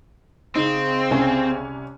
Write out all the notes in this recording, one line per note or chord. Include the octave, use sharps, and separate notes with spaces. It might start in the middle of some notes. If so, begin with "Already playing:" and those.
C#3 C4 D#4
C2 C#4 G#5